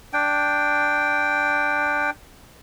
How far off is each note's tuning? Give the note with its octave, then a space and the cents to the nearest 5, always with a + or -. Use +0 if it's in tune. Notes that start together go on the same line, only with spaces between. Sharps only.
D4 +0 G5 +0